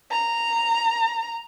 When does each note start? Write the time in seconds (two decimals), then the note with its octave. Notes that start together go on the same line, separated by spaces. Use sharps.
0.11 A#5